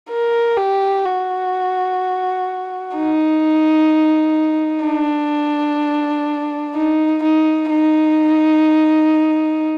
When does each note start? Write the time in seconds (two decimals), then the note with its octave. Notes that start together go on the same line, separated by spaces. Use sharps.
0.11 A#4
0.57 G4
1.05 F#4
2.95 D#4
4.85 D4
6.75 D#4
7.23 D#4
7.70 D#4